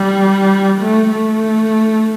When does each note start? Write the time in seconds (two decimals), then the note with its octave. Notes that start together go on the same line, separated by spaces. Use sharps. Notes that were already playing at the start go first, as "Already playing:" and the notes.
Already playing: G3
0.81 A3
1.10 A3